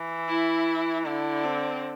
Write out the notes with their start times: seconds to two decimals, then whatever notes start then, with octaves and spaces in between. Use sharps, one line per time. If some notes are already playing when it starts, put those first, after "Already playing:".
Already playing: E3
0.28 E4
1.05 D3 E4
1.43 C4